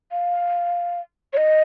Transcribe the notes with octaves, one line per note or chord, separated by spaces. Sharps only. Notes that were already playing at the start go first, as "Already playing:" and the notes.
F5
C#5
D#5